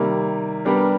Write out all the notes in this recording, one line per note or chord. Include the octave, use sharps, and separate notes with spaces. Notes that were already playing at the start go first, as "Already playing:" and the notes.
Already playing: C3 D#3 G3 A#3
G3 B3 D4 G4 A#4